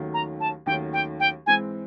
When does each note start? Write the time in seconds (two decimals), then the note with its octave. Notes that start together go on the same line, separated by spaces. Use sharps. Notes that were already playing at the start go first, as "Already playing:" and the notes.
Already playing: D#2 D#3 F#3 A3 C#4
0.13 A#5
0.40 A5
0.66 D#2 D#3 F#3 A3 C#4 G5
0.93 G5
1.19 G5
1.46 G#2 E3 G#3 C4 G#5